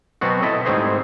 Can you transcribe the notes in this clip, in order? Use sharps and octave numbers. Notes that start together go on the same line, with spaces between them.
B2 F#3 B3 C4 F#4
E4 A4 D#5
G#2 G3 A3 C4 G#4 C5